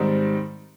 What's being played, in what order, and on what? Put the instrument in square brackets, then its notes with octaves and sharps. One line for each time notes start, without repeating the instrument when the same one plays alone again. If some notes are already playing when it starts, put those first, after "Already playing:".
Already playing: [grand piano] G#2 D#3 G3 C4 D#4